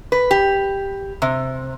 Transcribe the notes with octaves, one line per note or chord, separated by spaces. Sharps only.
B4
G4
C3